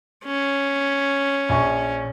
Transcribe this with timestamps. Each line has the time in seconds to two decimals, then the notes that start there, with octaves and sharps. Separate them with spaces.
0.25 C#4
1.49 A#1 G#5 C#6